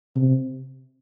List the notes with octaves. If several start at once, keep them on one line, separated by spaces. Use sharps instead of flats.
C3